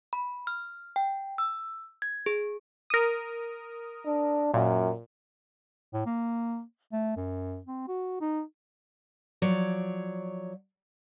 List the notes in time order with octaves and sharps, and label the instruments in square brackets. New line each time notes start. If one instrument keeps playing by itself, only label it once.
[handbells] B5
F6
G5
E6
G#6
G#4
[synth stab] A#4 D#6
[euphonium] D4
[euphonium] F#2 [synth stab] A#2
[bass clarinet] A2
A#3
A3
F#2
C4
F#4
D#4
[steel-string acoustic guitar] F3 F#3 C#5 D5